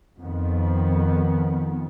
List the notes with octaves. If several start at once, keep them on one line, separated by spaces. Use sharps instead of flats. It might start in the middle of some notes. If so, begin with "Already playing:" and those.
F2 D#3 B3